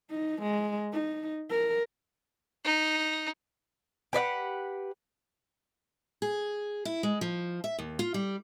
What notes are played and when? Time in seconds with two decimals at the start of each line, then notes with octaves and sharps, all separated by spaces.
0.10 D#4
0.42 G#3
0.92 D#4
1.50 A#4
2.64 D#4
4.13 G4 B4 D5 F#5
6.22 G#4
6.85 E4
7.03 G#3
7.21 F3
7.64 E5
7.78 D#2
7.99 F4
8.14 G3